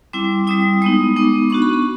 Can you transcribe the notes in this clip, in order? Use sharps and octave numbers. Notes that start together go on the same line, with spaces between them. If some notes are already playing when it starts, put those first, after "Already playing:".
G3 C4 E4 D6
G3 C4 E4 D#6
G#3 B3 D#4 D#6
G#3 B3 D#4 D6
B3 D4 F#4 C#6
B5
B5